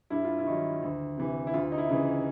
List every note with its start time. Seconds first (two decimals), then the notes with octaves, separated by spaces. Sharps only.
0.10 G2 E4
0.25 F4
0.39 E4
0.46 D#3 F#3
0.82 D2
1.18 C3 E3
1.47 E4
1.54 D2 F4
1.72 D#4
1.78 E4
1.89 C#3 E3